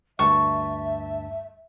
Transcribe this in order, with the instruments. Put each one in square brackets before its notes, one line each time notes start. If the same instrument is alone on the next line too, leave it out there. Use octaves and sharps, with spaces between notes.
[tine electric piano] D2 G2 A5 [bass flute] E5 [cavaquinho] C#6